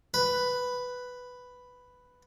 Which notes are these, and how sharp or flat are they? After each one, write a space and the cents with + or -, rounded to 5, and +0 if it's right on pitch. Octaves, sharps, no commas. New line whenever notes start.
B4 +5